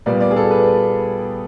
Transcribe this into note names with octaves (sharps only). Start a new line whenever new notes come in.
A#2 G3 B3 D5
D5
G#4
A4
B4